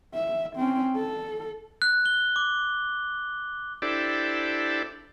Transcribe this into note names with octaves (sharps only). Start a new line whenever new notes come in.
E5
C4 C#4
A4
F#6
G7
D6
D4 E4 G4 A4 C5 D5